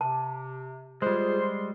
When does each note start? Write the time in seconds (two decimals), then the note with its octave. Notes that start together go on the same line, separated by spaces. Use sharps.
0.01 C3 A5
1.02 G3 G#3 F4 G#4 C5
1.39 C6